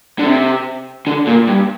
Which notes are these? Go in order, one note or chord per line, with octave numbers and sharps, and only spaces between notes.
D3
C3
D3
A#2
G2